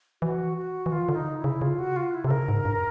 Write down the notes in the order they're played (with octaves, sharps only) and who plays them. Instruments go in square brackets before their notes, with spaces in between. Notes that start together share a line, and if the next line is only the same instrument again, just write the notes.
[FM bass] E3 [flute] F#4
[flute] F#4
[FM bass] E3
[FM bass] D#3 [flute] F4
[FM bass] D3
[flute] D#4
E4
[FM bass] C#3
[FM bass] C#3 [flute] F4
[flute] F#4
F4
E4
[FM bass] C3 [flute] A4
[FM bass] C#3 [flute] A#4
[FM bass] G#2
G2